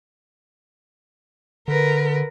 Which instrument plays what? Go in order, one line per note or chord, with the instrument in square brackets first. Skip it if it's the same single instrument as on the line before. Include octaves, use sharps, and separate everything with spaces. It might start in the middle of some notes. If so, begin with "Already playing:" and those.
[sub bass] D3 [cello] A#4 B4